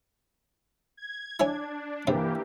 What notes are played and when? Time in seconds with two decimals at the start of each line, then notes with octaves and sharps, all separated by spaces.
0.97 G#6
1.40 D4 E4 C#5 G#5
2.07 G2 C3 E3 A#3 G4